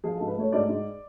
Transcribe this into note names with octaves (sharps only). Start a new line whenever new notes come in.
F3 G#4
G#2 A4
B4
A3 C#5
G#2 D5
G#2